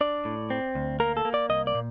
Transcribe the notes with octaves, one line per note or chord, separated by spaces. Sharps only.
D4 D5
A2
C4
D2
A#3 A#4
A4
A#3
D5
C2 D#5
D5
A#2